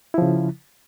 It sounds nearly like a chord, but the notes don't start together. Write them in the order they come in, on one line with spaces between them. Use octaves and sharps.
E4 F3 C#3